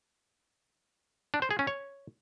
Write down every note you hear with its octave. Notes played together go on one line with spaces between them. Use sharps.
D4
C5
G#4
C#4
C#5